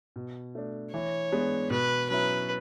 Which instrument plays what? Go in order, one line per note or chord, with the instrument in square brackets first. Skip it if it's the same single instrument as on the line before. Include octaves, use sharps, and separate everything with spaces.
[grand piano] B2
A3 D4
[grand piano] E3 [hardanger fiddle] C#5
[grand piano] G#3 B3 D4
[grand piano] B2 [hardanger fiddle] B4
[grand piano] F#3 C#4 E4 [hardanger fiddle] B4